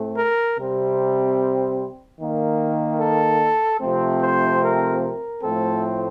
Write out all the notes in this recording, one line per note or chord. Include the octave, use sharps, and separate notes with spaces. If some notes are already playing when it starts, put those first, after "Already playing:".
Already playing: A2 A3 C4
A#4
C3 G3 C4
D#3 A#3
A4
C3 F3 A3 C4
C5
A#4
A#4
A2 F3 A3 C4 A4